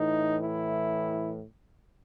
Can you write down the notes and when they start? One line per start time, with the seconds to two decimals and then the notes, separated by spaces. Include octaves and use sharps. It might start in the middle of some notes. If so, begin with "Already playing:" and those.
Already playing: A2 E3 D#4
0.43 E4